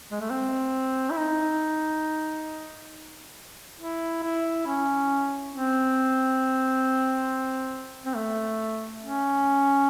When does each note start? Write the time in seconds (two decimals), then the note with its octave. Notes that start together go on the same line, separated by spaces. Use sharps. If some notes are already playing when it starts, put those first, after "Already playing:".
0.11 G#3
0.20 A3
0.30 C4
1.10 E4
1.18 D#4
3.79 E4
4.23 E4
4.67 C#4
5.54 C4
8.06 C4
8.15 A3
9.03 C#4